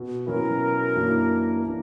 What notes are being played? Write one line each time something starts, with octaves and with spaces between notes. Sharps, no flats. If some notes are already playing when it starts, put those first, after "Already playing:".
Already playing: B2
B2 F#3 C#4 E4 A#4
F#2 E3 A#3 D4
E3 A#3 D4